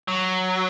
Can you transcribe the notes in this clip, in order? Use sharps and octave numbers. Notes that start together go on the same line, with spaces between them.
F#3